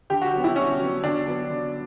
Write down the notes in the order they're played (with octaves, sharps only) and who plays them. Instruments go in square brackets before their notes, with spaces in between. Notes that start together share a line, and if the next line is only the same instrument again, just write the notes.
[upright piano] D3 [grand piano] G4
[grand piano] F#4
[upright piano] F#3 B3
[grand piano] E4
[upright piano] D3 [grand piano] C#4
[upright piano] F#3 B3
[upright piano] D3 [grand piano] D4
[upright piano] F#3 B3
D3